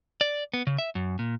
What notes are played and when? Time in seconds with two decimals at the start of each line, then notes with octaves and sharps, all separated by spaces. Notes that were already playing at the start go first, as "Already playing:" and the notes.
0.21 D5
0.54 B3
0.67 C#3
0.78 E5
0.95 F#2
1.19 A#2